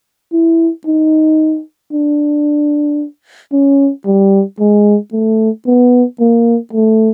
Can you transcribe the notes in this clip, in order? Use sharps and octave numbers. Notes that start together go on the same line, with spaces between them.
E4
D#4
D4
C#4
G3
G#3
A3
B3
A#3
A3